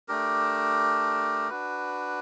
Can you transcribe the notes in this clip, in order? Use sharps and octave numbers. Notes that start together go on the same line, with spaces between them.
A3 D4 G4 A#4
D4 F#4 B4